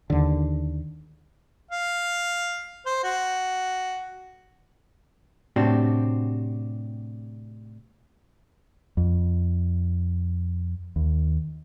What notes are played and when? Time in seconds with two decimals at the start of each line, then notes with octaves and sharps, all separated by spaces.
0.10 D#2 D3
1.71 F5
2.86 C5
3.04 F#4
5.56 A2 C3 C4 D4 F#4 G4
8.97 F2
10.96 D#2